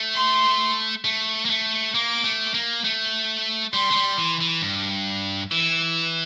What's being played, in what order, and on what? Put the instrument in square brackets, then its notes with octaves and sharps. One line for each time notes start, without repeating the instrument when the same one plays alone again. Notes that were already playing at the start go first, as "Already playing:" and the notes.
Already playing: [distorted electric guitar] A3
[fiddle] C6
[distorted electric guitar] A3
A#3
A3
[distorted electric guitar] A#3 [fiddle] D6
[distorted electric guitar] A3
A#3
A3
[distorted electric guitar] G3 [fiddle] C6
[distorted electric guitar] A3
G3
E3
E3
G2
[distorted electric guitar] E3 [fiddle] E6